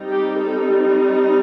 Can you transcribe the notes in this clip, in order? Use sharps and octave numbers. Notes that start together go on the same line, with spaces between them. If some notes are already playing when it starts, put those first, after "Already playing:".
Already playing: G3 C4 D#4
G4
A4